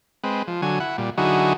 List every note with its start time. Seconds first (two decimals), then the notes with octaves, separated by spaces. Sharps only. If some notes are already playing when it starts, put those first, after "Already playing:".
0.24 G#3 C4 B4
0.48 F3
0.62 D3 F#3 G#5
0.80 E4 F#5
0.98 A#2 G3
1.18 D3 F#3 D#4 E4 F#4 G#4